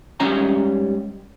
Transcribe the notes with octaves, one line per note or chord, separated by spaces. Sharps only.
G#2 G3 C#4 C#5 D#5 A#5